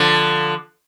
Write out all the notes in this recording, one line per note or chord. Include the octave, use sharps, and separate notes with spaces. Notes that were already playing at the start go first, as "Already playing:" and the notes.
Already playing: D3 F3